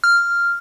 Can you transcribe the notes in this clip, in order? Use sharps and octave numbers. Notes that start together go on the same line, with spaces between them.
F6